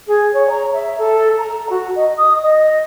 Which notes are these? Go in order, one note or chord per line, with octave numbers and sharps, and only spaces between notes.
G#4
C#5
A#5
E5
A4
A#5
F#4
D#5
D#6
D#5